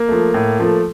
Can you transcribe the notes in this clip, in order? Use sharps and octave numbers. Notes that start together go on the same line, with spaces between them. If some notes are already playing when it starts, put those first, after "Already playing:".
Already playing: A#3
F3 A3
A2
F3 A3